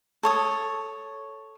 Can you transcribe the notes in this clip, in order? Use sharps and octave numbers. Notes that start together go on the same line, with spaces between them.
A4 C#5 D#6